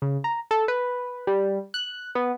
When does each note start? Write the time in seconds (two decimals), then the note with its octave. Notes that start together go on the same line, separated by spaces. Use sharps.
0.02 C#3
0.24 A#5
0.51 A4
0.68 B4
1.27 G3
1.74 F#6
2.15 B3